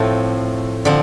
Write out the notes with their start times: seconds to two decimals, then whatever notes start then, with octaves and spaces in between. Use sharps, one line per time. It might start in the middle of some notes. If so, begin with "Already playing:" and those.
Already playing: A2 F3 A3 C4
0.85 D3 F3 C4